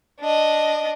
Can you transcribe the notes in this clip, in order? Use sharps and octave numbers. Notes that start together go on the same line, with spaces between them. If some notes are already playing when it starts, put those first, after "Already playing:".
D4 D#5